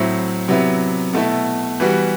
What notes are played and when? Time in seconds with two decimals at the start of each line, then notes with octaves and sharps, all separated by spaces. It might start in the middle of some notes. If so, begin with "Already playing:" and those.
Already playing: A2 F#3 C4 E4
0.48 C3 F#3 B3 E4 B4
1.13 B2 A3 E4
1.80 E3 G3 B3 F#4